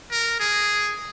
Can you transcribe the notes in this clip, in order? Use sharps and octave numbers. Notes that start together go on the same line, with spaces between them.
A#4
G#4